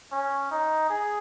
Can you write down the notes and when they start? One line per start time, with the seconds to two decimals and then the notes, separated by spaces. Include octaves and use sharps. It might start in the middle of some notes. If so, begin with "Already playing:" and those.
0.12 C#4
0.51 D#4
0.90 G#4